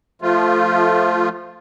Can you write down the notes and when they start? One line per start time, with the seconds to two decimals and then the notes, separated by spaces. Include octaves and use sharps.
0.22 F3 A3 F4